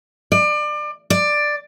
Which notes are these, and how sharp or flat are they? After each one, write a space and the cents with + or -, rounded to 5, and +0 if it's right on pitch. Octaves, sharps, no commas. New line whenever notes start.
D5 +30
D5 +10